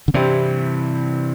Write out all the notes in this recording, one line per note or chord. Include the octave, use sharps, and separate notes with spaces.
D3
G2 C3 E3 G3 C4 E4 G4